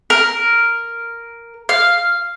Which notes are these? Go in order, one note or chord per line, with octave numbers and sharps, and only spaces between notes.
A#4
F5